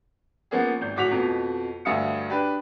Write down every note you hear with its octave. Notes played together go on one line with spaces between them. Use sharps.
F3 A#3 B3 C#4 G#4
G#1 G6
D1 F#4 D6 B6 F7
F2 B2
D2 G2 E5 F5 D#6 C#7
D4 G4 B4